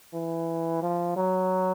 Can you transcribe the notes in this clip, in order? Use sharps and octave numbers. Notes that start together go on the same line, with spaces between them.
E3
F3
F#3